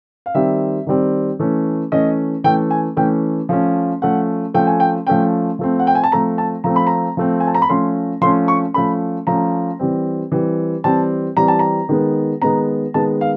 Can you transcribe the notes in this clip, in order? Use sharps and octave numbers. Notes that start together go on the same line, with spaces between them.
F5
D#3 G3 C4 E5
D#3 G3 C4
E3 A3 C#4
E3 A3 C#4 D#5
E3 A3 C#4 G5
G#5
E3 A3 C#4 G5
F3 A3 C#4
F3 A3 C#4 F#5
F3 A3 C#4 G5
G#5
G5
F3 A3 C#4 G5
F3 A3 C4
F#5
G5
G#5
A5
F3 A3 C4 A#5
A5
F3 A3 C4 A#5
B5
A#5
F3 A3 C4
G#5
A5
A#5
B5
F3 A3 C#4 C6
F3 A3 C#4 C6
C#6
F3 A3 C#4 B5
F3 A3 C#4 A#5
E3 G3 C4
E3 G3 C4
E3 G3 C4 A5
E3 G3 C4 A#5
A5
A#5
D#3 G#3 B3
D#3 G#3 B3 A#5
D#3 G#3 B3 A5
F5